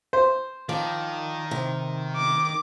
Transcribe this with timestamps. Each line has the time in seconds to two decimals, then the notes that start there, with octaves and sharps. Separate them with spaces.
0.13 C5
0.69 D#3 F3 D5
1.51 C3
2.17 D6